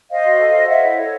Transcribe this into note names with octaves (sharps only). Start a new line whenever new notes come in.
C5 D#5 F5
F#4
A4
C5
C#5 E5 F#5
E4
A4 C#5